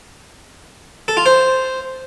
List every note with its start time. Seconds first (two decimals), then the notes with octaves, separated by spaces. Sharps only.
1.08 A4
1.17 F4
1.26 C5